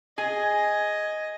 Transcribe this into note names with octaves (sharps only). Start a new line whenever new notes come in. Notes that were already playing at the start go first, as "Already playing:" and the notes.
G#4 D#5 G#5 G#6